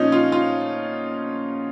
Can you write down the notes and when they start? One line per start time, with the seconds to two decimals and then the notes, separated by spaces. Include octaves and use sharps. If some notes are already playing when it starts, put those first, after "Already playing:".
Already playing: A#2 F3 C#4 D#4
0.12 F4
0.32 F4